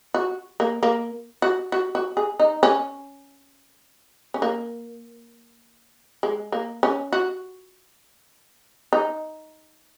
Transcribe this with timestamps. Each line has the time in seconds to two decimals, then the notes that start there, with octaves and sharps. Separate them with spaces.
0.14 F#4
0.60 A#3
0.83 A#3
1.42 F#4
1.72 F#4
1.95 F#4
2.17 G#4
2.40 D#4
2.63 C#4
4.34 C#4
4.42 A#3
6.23 G#3
6.52 A#3
6.83 C#4
7.13 F#4
8.93 D#4